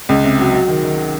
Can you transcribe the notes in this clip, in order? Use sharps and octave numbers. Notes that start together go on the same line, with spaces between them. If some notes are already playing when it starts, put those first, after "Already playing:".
C#2
C3
F#3
F#3
D#3
D#3